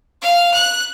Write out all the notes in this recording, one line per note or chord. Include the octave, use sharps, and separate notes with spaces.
F5
F#6